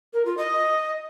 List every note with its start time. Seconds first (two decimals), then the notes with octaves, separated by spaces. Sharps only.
0.14 A#4
0.26 F4
0.38 D#5